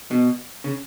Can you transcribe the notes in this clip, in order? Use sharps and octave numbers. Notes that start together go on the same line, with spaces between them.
B2
C#3